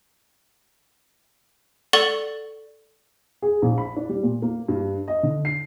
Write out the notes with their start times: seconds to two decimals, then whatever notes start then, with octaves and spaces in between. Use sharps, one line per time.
1.93 A4 D5 F#5 C#6 A6 G7
3.42 G#4
3.62 A#1
3.78 B5
3.96 D4
4.09 G3
4.23 A#2
4.42 A#3
4.68 G2
5.08 D#5
5.23 D3
5.45 C7